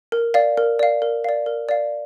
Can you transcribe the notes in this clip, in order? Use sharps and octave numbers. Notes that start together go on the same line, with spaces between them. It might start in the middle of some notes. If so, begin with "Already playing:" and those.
A#4
D5 F5
A#4
D5 F5
A#4
D5 F5
A#4
D5 F5